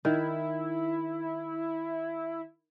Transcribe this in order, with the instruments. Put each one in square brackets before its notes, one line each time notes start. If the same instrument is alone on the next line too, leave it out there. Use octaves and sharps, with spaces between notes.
[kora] D#3 [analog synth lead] E4